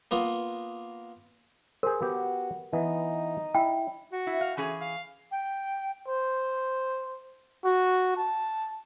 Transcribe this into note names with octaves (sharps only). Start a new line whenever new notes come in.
A#3 B3 F4
G#4 A#4 C5
B3 F#4 G4
E3 B3 D#4
E4 G5
F#4
E4
F5
E3 C#4 G#4
F5
G5
C5
F#4
A5